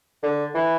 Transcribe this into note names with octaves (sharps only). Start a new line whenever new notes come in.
D3
E3